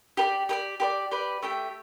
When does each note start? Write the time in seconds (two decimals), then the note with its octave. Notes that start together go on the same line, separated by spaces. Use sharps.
0.17 G4 B4 D5
0.49 G4 B4 D5
0.80 G4 B4 D5
1.11 G4 B4 D5
1.42 A3 G4 E5 G5